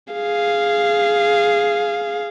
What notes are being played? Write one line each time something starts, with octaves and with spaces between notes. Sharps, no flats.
G#4 F5